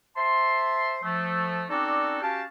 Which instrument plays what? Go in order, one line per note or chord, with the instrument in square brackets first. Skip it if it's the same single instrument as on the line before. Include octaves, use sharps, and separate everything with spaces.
[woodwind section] C5 E5 A5 C6
F3 A3
C4 C#4 D#4 F#4 A4 D5
C#4 F#4 G4 F5 A5